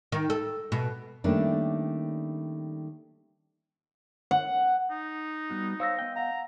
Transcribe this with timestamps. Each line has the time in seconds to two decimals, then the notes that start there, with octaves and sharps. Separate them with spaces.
0.12 D#3
0.30 A4
0.72 B2
1.24 D#3 G3 A3 A#3 C#4 D4
4.31 F#5
4.91 D#4
5.50 G3 B3 F#4
5.80 C5 C#5 F5 E6 A#6
5.99 B3 D#5 G5
6.16 F5 F#5 A#5